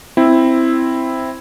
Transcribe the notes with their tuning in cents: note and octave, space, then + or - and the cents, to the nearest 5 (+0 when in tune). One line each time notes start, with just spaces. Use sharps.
C4 +0 E4 +0